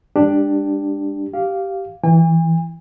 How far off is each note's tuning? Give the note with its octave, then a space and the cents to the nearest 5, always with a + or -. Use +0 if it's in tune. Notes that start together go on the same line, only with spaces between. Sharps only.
G#3 -45 D4 +5 G4 +5
G4 -15 F5 +0
E3 +0 G#5 -45